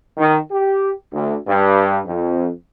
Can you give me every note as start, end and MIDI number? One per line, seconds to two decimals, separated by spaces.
0.18 0.38 51
0.51 0.91 67
1.12 1.35 38
1.47 2.00 43
2.07 2.49 41